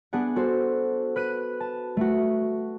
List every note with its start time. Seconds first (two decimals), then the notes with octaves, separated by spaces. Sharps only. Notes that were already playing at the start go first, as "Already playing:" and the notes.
0.13 B3 D4 G#4 F#5
0.36 F#4 A4 C5
1.16 B4 F#6 D#7
1.60 A5
1.97 A3 F#4